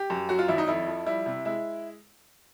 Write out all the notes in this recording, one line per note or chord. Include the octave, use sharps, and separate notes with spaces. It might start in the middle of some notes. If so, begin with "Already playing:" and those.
Already playing: G4
F#2
F#3 F#4
F4
G#1 E4
D#4
F2 E4
F3
G3 E4
C3
G#3 E4